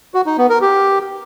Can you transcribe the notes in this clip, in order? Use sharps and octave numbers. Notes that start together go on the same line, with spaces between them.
F#4
D#4
B3
A#4
G4